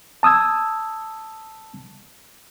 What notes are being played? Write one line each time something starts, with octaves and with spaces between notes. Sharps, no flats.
A5 D#6 E6 G#6